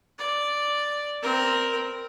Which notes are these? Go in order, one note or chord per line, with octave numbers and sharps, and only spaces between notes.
D5
C4 A#4